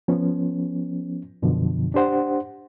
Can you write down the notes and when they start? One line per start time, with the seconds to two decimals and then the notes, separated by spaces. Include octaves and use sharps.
0.08 F3 B3 C#4
1.42 F#2 B2 D3 F3
1.94 D4 G4 C5 F#5